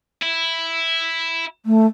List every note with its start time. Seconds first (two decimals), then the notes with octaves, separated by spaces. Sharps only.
0.22 E4
1.66 A3